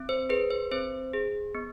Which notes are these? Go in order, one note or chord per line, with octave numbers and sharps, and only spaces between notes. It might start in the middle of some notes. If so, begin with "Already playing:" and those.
Already playing: C4
C5
G#4 B4
C5
C4 C5
G#4
B3